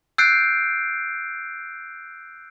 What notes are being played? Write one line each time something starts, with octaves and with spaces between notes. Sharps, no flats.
E6 F#6 G6 A6 C7 D7